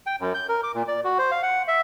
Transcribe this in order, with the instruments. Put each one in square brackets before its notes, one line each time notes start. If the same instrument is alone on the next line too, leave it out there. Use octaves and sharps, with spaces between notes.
[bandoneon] G5
F#2
G6
A#4
D6
A#2
D5
F#4
C5
F5
F#5
E5